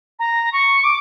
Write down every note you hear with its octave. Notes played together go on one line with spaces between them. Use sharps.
A#5
C#6
D6